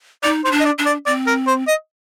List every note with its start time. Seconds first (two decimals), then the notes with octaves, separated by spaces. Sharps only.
0.23 D#4 D5
0.44 D#4 C5
0.51 D4
0.60 D#5
0.65 D5
0.78 D4
0.86 D5
1.06 C4 D5
1.27 A#4
1.47 C5
1.67 D#5